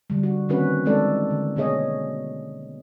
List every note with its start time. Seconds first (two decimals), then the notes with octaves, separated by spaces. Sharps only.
0.10 D3 G3
0.23 F#4
0.49 D#3 A#3 C4 C#4 F#4 B4
0.85 E3 G#3 C4 D#4 A4 D5
1.30 D3
1.56 B2 A#3 B3 G#4 C#5 D#5